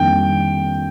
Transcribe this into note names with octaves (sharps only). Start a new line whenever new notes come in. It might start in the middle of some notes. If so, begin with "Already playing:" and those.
Already playing: F2 D#3 G3 A#3 D4 G5